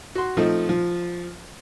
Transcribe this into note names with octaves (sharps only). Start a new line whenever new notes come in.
F#4 C6
F3 A3 C4 D#4
F3